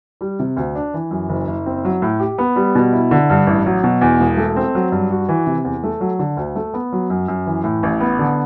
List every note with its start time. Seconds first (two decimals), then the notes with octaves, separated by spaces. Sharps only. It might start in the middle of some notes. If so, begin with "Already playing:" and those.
0.21 G3
0.39 C3
0.56 D2
0.75 D4
0.94 E3
1.11 F#2
1.29 F#1
1.47 F#1
1.66 C4
1.85 F#3
2.02 A2
2.20 G4
2.38 B3
2.56 G3
2.75 B2
2.93 E4
3.11 D3
3.30 G2
3.47 A1
3.66 F#3
3.84 B2
4.01 E2
4.20 E1
4.37 A3
4.56 C4
4.75 F#3
4.92 G2
5.11 F#4
5.28 E3
5.47 C3
5.65 E2
5.84 A3
6.01 F#3
6.19 D3
6.37 D2
6.56 A3
6.74 B3
6.92 F#3
7.10 F#2
7.28 F#2
7.47 E3
7.64 A2
7.83 A1
8.00 B3
8.19 D3